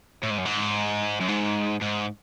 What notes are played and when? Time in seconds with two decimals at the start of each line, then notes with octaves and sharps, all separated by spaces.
0.23 A2
0.30 G#2
0.38 F#2
0.45 G#2
1.21 F#2
1.28 G#2
1.81 G#2